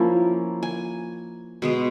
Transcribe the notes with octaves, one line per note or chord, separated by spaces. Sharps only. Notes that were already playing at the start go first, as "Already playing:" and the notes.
Already playing: F3 A#3 C#4 E4
G#5
B2 G#3 B3